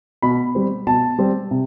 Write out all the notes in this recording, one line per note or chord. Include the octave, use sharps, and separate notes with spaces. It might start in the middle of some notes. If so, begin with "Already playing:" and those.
B2 B5
G3 C4
B2 A5
G3 C4
C3